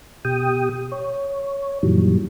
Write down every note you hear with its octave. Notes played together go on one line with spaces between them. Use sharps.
B2 G4 G5 D#6
C#5
F#2 A#2 D#3 E3 F#3 G3